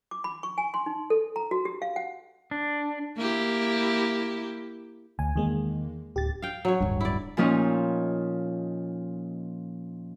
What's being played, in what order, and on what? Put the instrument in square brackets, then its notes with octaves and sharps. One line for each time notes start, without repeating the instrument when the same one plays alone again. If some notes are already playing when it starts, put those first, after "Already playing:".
[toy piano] D6
B5
C#6
G#5
C6
D#4
A4
A#5
F#4
G4
F5
F#5
[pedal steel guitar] D4
[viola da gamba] A#3 E4 G4
[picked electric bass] D2 [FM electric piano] G#5
[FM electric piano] E2 G#3 A#3 [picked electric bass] D#3
[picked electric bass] D1 [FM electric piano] G4 A6
[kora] F5 G5
F#3 C#5
[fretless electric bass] D1 G1 G2
[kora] E4 D5
[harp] A#2 F3 A#3 C#4 D#4